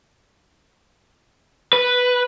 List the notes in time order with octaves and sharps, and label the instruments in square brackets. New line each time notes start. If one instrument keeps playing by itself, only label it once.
[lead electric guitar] B4